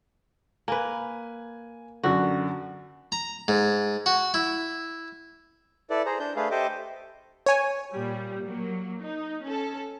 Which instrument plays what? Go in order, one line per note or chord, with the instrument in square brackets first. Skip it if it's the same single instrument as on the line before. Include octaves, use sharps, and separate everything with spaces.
[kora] A#3 B4 [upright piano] G#5
[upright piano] F#2 D3 F#3 [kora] F#4
[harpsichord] A#5
G#2
F#4
E4
[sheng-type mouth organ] E4 A4 B4 D5
G#4 C5 A#5
D4 G6
A3 D4 G#4 B4 F5
G4 A4 C5 D#5 E5 D6
[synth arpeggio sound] C#5 G#5
[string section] A#2 G3
F#3 A#3
D#4
C#4 A4